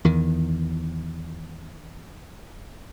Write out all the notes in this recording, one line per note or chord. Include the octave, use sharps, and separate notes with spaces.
E2 D#3